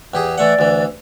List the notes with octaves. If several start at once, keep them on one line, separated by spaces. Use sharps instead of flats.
E2 G4 G#4
E3 A3 D5 F#5
D2 E3